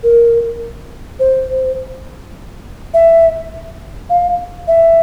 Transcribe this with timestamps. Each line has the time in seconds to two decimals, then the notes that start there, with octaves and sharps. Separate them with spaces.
0.03 A#4
1.20 C5
2.94 E5
4.10 F5
4.68 E5